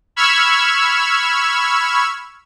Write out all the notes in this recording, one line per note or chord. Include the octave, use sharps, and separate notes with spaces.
B5 C#6 E6 F6 G#6